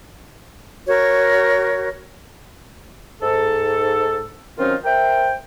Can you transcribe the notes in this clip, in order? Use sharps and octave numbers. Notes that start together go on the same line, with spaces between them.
F#4 A#4 C#5
G#2 A4
D#3 F#3 C4 C#4 D#4 F4
A#4 C5 E5 G5